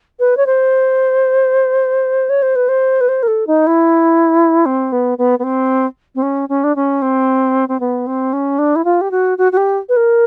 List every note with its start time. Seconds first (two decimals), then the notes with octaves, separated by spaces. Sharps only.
0.20 B4
0.37 C#5
0.46 C5
2.30 C#5
2.42 C5
2.56 B4
2.69 C5
3.01 B4
3.09 C5
3.23 A#4
3.28 A4
3.47 D#4
3.67 E4
4.66 C4
4.92 B3
5.18 B3
5.39 B3
5.44 C4
6.15 C4
6.22 C#4
6.49 C#4
6.64 D4
6.76 C#4
7.02 C4
7.69 C4
7.80 B3
8.07 C4
8.33 C#4
8.59 D4
8.76 E4
8.85 F4
9.01 G4
9.11 F#4
9.38 F#4
9.52 F#4
9.57 G4
9.89 B4
9.97 A#4